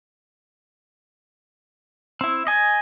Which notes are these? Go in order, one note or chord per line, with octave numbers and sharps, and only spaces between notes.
C4 E4
D#5 G#5